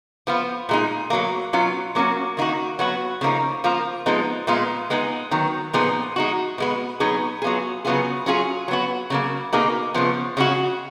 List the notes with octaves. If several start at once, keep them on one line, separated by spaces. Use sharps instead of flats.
F3 B3 F4
A#2 G#3 D#4
B2 F#3 A#3
B2 F#3 C#4 F4
F#3 A#3 C#4 F#4
D#3 A#3 D#4 F#4
F#3 B3 F#4
C#3 F3 A#3 D#4
F3 A#3 F4
F3 G#3 B3 D#4
A#2 G#3 B3 F4
G#3 B3 D#4 G#4
D#3 F#3 B3
A#2 F3 B3 D#4 G#4
G#3 D#4 F#4
B2 G#3 B3
B2 F#3 B3 D#4 G#4
F#3 B3 F4 G#4
C#3 F#3 B3 F4 G#4
F#3 C#4 F4 G#4
F#3 B3 F#4
C#3 F#3 A#3
B2 A#3 D#4 G#4
C#3 F3 B3
C#3 G#3 C#4 F#4